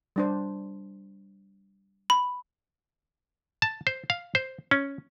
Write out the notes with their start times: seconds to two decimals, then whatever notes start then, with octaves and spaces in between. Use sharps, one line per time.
0.16 G3 D4 C5
2.10 B5
3.62 A5
3.87 C5
4.10 F5
4.35 C5
4.71 C#4